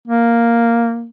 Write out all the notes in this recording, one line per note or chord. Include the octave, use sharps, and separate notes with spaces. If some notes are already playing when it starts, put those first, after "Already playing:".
A#3